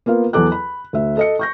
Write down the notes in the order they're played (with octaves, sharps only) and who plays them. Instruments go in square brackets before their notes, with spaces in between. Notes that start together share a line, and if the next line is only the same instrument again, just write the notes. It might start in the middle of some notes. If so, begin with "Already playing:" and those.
[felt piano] A#3 B3 F4 F5
E2 F#3 A4 D6 F#6
B5
D2 E5
A4 D#5 C#7
C#6 G6 A#6